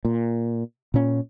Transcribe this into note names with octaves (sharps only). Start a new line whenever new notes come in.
A#2
A#2 C#4